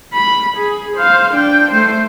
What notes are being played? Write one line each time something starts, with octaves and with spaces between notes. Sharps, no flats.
B5
G#4
C5 F5
D4 G5
A3 C5